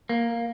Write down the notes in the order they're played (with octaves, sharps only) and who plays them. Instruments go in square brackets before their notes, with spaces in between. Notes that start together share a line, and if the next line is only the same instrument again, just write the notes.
[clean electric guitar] A#3